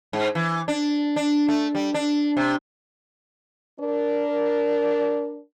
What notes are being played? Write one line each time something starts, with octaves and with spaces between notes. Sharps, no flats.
G#2
E3
D4
D4
A3
G3
D4
C3
D4 A#4